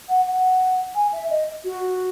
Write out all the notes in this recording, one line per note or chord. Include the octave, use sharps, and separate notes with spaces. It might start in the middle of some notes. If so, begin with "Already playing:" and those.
F#5
F#5
G#5
E5
D#5
F#4